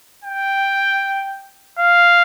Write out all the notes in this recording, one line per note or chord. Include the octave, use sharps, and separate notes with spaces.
G5
F5